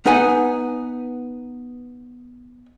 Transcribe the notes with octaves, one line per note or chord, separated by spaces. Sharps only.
B3 D#4 B4 F#5 G#5